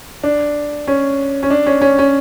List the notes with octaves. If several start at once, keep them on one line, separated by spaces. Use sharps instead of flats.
D4
C#4
C#4
D4
C#4
C#4
C#4